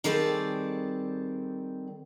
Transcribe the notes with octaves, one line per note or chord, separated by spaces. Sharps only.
D#3 G3 C4 G#4 A4 D5